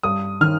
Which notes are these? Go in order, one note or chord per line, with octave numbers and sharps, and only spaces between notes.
G2 D#6
D#3 F6